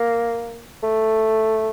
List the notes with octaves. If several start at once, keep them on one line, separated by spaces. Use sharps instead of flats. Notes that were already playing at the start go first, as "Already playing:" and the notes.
Already playing: A#3
A3